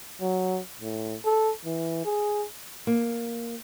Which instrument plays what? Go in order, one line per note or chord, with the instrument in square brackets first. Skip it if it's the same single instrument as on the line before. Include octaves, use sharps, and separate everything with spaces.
[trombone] F#3
A2
A4
E3
G#4
[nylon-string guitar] A#3